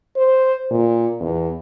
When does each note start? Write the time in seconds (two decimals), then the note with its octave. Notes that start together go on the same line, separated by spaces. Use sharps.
0.16 C5
0.71 A#2
1.20 E2